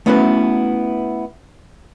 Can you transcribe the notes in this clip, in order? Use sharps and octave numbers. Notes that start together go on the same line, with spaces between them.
A3 B3 C#4 E4 F#4 B4